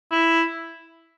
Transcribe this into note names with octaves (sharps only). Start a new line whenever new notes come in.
E4